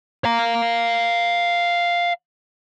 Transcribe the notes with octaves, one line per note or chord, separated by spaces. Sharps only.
F5 A#5